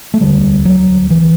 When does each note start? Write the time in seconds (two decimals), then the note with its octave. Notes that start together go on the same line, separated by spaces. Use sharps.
0.14 A3
0.21 E1 D2 D3 G3
0.65 F#3
1.10 E3